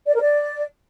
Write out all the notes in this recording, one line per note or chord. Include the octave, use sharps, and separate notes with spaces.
D5
A#4
D5